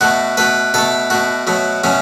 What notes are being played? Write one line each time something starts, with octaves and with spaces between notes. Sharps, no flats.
B2 A3 F#4
B2 A3 B4
B2 A3 A4
B2 A3 F#4
B2 F#3 A3
B2 F#3 A3 C#4